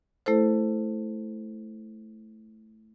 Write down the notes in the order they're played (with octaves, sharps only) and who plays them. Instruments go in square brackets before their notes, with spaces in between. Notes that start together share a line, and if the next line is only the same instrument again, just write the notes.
[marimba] A3 E4 A4 C5